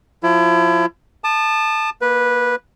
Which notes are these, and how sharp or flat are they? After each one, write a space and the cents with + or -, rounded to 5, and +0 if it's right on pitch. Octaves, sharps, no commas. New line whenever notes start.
F3 +25 E4 +35
A5 +0 D#6 -45
A#3 +20 B4 -10